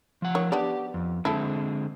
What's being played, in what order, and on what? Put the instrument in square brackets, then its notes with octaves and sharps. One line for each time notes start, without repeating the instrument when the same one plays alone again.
[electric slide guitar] F3 F#5
[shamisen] D#3 C#5
[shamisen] B3 D4 D5 [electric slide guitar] G4
[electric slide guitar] F2
[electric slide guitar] D3 G#3 C4 [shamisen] E4 A4